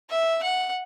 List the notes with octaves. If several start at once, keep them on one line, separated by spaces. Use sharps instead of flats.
E5
F#5